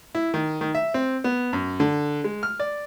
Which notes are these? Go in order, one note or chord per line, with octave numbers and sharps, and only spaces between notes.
E4
D#3
D#3
E5
C4
B3
F#2
D3
G#3
F6
D5